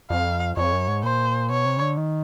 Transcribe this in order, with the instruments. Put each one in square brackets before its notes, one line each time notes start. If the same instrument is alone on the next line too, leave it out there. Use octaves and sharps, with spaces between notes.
[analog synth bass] F2 [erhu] F5
[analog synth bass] F2 [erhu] C#5
[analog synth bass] F#2
G#2
[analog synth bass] A#2 [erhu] C5
[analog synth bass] B2 [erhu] C#5
[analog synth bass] C3
C#3
D3
D#3